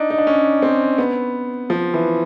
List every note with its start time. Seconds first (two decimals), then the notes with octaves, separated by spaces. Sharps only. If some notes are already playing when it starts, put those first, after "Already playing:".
Already playing: D4 D#4
0.10 D#4
0.18 D4
0.27 C#4
0.62 C4
0.98 B3
1.70 F3
1.94 E3